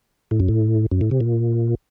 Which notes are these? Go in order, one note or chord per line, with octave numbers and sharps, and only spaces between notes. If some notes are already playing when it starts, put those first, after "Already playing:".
A2
F#2
A2
F#2
A2
C3
A#2